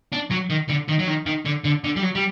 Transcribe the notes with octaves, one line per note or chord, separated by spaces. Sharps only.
D4
F#3
D#3
D3
D#3
F#3
D#3
D#3
D3
D3
D3
G3
F#3
G3